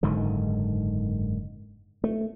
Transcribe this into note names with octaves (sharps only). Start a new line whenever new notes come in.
F#1 G#2 D3 D#3
A3